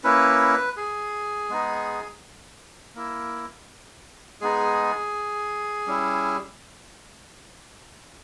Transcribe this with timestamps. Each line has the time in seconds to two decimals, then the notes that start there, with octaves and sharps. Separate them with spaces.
0.04 A#3 C#4 E4 B4
0.77 G#4
1.49 G#3 B3 D#4
2.95 A#3 E4
4.40 G#3 B3 D#4 G#4
5.87 G3 C#4 E4